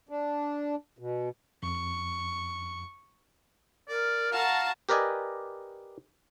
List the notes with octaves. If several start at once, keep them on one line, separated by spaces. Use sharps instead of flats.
D4
B2
F2 C#6
A#4 D5
F#4 F5 A5 A#5
G4 A#4 B4 D5 D#5 G#5